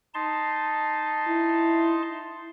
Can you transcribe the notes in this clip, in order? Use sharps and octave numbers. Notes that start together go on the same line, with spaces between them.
D#4 A5 C6
E4